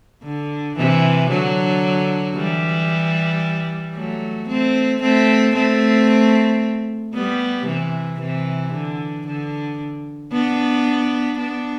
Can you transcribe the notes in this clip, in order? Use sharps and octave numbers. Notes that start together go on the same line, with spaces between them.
D3
C3 E3
D3 F#3
E3 G3
F#3 A3
A3 C4
A3 C4
A3 C4
G3 B3
C3 E3
C3 E3
D3
D3
B3 D4
B3 D4